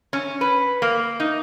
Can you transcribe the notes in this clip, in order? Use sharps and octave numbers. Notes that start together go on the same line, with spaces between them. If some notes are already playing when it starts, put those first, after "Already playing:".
C#4
B4
A#3
D#4